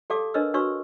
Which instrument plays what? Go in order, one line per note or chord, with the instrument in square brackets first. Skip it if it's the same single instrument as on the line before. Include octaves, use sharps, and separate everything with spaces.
[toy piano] G4 A4 D5 F5 A5 D6
D4 A#4 B4 C#5 D#5 E6
D4 F#4 B4 C#5 C#6 E6